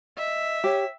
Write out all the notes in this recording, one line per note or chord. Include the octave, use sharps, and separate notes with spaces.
D#5 E5
G4 C#5